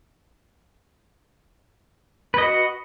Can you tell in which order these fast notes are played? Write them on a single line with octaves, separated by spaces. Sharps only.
B4 D#5 F#4